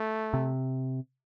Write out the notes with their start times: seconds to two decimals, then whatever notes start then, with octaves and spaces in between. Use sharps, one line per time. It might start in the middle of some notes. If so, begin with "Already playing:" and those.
Already playing: A3
0.34 C3